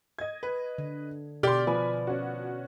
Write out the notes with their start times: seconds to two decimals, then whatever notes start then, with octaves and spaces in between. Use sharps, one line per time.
0.19 D#5 G#6
0.43 B4
0.78 D3
1.43 B2 G4 D5 C6 F6
1.67 F3 B4 G#5 B5
2.07 C#4 F#4